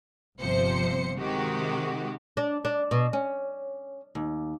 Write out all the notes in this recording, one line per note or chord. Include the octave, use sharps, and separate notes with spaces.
G1 C3 F3 C5 C#7
C3 D#3 G#3 F#4 G4
D4
D4
B2
C#4
D#2